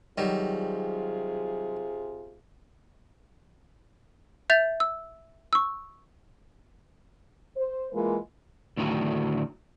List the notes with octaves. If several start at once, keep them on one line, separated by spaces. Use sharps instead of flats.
C3 D#3 F#3 G3 F4 G#4
E5 G6 A6 F7
E6
C#6 E6
C5
E3 G#3 A#3 F4 A#4
D2 A2 D#3 E3 F#3